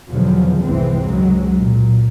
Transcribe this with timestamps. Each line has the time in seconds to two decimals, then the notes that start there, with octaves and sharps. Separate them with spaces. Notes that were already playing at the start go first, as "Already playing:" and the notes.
0.10 E2 B2 D3 D#3 F3 F#3
0.61 C2 G#2 B2 E3 G#3 C4
1.04 C#2 F#2 F#3 G#3
1.59 A#2